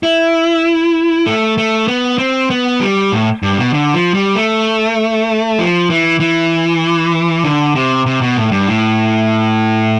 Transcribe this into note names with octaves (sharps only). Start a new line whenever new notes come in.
E4
A3
A3
B3
C4
B3
G3
A2
G2
B2
D3
F3
G3
A3
F3
E3
E3
D3
C3
C3
B2
A2
G2
A2